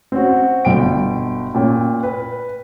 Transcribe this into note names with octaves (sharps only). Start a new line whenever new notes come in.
C4 C#4 F#4
G1 B2 G5 D7
A#2 C#4 G5
B4